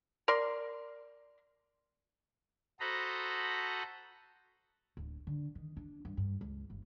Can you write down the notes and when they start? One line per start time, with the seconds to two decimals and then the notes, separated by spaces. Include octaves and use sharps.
0.28 A#4 D5 C6
2.80 F#4 A4 C5 D#5 A#5 B5
4.97 D1
5.27 D3
5.55 D#3
5.77 D4
6.05 G2
6.17 G2
6.41 C#2
6.70 G1